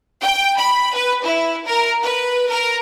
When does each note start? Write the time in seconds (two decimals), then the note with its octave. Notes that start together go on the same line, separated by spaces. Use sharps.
0.23 G5
0.59 B5
0.95 B4
1.24 E4
1.66 A#4
2.03 B4
2.49 A#4